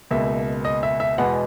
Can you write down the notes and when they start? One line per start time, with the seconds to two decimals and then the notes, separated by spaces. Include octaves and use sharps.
0.11 C#2 B2 A#3 E5
0.65 D#5
0.83 E5
1.00 E5
1.18 E2 B2 G#3 B3 F#5